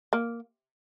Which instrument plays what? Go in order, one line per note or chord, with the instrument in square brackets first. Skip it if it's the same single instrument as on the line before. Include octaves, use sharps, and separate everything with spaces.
[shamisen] A#3